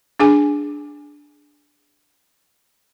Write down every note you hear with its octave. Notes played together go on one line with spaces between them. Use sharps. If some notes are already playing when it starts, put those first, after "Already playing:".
D4 G#4 G#5